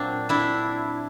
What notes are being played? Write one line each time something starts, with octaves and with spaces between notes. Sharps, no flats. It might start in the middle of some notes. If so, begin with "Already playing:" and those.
Already playing: A#2 F#3 C4 D4
D4 E4